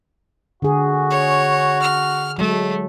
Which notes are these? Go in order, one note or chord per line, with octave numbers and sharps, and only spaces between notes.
D3 F#4 G#4
C#5
F6
F#3 G#3 A3